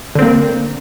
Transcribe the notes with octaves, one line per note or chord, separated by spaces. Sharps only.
D3 A#3 C4